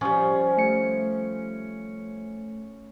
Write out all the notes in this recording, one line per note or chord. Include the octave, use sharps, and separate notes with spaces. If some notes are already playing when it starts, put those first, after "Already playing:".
F3 G3 C#4
A3 C#7